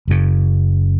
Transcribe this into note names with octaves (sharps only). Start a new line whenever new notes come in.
F#1 F#2 C#3